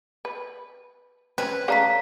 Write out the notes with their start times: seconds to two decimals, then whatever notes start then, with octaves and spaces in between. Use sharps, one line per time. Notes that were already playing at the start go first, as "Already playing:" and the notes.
0.25 B4
1.38 C4 C#4 B4
1.68 C#3 A3 D4 F5 A#5 B6